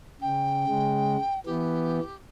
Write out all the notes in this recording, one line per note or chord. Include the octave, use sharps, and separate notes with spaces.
C#3 G5
C#3 G#3
E3 B3 G4